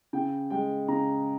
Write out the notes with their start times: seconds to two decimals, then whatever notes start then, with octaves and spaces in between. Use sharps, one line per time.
0.13 C#3 G5
0.50 G#3 G5
0.88 C#3 A#5